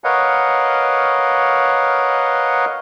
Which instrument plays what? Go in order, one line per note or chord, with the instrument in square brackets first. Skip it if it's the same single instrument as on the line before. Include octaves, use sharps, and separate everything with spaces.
[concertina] A#4 B4 C#5 D#5 F5 F#5